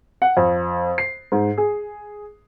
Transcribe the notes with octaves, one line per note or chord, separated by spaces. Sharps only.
F#5
F2
C7
G#2
G#4